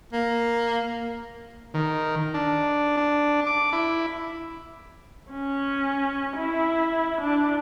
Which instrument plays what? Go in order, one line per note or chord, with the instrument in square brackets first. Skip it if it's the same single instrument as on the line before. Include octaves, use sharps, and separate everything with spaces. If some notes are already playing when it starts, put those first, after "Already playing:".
[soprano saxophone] A#3
[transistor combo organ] D#3
D4
D4
D6
E4
[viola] C#4
E4
D4